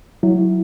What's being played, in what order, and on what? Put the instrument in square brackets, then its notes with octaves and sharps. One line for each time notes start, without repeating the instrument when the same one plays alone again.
[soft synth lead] F#3 [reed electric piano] E4